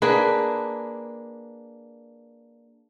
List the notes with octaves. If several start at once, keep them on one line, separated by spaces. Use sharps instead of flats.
A#3 D4 G#4 B4